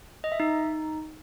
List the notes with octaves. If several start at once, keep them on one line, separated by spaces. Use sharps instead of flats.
D#5
E5
D#4